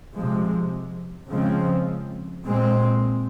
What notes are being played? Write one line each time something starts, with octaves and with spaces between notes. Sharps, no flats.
C3 F3 G#3
C#3 F3 G#3 C4
A#2 G#3 C4